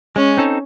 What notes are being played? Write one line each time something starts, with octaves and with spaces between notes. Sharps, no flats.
G#3 C#4
C4 D#4 A4